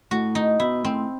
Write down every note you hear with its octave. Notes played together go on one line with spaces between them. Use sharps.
A2 F#4
D#4
B2 E4
A2 C4